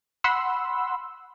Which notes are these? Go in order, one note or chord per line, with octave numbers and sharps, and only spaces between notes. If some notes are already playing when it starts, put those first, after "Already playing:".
F#5 B5 C6 E6